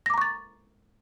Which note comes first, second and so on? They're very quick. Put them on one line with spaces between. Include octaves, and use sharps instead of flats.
A#6 D6 A#5 C#6 A6